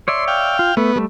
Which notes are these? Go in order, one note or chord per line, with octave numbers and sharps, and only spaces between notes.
C#5 D5 E5 C6
F5 G5
F4
A3 B3
G3 A3